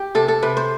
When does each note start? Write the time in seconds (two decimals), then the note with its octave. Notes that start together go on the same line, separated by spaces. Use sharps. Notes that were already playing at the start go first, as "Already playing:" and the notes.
Already playing: G4
0.15 C3 A4
0.28 A4
0.42 C3 B4
0.57 C5